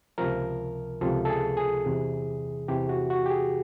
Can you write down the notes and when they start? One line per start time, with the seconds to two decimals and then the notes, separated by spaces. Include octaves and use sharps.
0.18 C#2 C3 F3 A#4
1.01 C#2 C3 F3 A4
1.25 A4
1.30 G#4
1.57 G#4
1.85 E2 C3 E3
2.68 E2 C3 E3 G4
2.89 F#4
3.10 F#4
3.26 G4
3.30 G#4